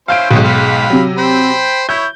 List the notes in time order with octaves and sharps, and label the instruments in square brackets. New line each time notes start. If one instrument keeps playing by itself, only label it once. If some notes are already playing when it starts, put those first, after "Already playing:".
[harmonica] C#4 E4 C5 [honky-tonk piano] F5 G6 D7
[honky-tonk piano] B1 G#2 [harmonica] C#5 D#5 G5
[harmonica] F5 G5 B5
[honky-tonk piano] C3 F#3
[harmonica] C5 G5 B5
[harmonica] E4 C#5 [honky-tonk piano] G6